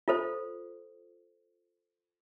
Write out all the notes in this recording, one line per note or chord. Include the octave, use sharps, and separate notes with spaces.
F4 A4 C5